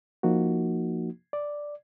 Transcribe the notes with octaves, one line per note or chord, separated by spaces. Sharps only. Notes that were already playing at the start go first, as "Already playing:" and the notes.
F3 A#3 D#4 F#4
D5